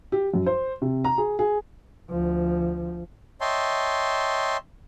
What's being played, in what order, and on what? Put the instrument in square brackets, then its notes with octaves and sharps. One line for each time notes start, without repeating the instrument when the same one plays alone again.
[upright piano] G4
F#2
C5
C3
A#5
G#4
G#4
[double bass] D2 F3
[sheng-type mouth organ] C#5 D#5 E5 G5 A5 C6